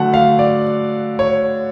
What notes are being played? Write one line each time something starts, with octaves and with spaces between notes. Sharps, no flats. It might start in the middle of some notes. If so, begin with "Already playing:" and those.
Already playing: D3 F#3 A3 F#5
F5
D5
C#5